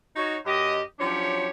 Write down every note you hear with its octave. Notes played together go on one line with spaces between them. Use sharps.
D#4 F#4 C#5
F#2 G4 D#5
F3 F#3 C#4 D4 G4 C#5